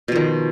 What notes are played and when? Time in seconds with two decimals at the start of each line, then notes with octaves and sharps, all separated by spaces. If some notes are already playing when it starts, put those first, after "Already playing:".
0.08 B2
0.12 F3
0.16 D#3